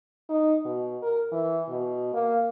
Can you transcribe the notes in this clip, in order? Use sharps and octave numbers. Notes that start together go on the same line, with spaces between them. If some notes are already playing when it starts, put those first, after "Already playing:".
D#4
B2
A#4
E3
B2
A#3